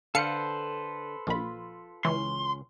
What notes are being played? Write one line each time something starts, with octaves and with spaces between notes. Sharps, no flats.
D3 A4 B4 C5 F5 C#7
A#1 A#2 F4 B5
C#2 E3 C#4 C6